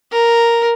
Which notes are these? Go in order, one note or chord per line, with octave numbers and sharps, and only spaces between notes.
A#4